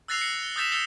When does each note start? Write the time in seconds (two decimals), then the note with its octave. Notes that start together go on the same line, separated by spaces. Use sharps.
0.08 E6 F#6 A6 A#6 C7 F7
0.21 C#7
0.43 G7
0.56 D#6 E6 G6 A6 B6 E7
0.72 D#6 E6 G6 A6 C#7 G7